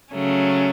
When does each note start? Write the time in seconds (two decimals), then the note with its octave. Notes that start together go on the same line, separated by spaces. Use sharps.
0.14 C#3 F#3 A3 C#4